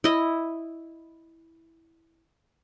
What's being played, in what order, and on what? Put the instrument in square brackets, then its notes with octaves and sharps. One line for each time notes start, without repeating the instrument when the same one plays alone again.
[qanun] E4 D#5